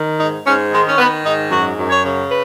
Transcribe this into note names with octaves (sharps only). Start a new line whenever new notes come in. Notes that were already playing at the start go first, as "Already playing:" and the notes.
Already playing: D#3
G#2 D#4
G#2 C#4
D#3 G#3
C#4
D#3 B3
G#2 D#4
F#2 F#4
F#2
C#5
C#3
B4